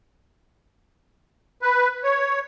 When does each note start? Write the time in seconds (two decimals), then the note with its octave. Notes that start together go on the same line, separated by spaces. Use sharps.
1.62 B4
2.04 C#5